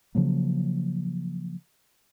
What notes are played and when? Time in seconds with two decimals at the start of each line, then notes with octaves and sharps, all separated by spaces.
0.15 C#3 F3 F#3 A#3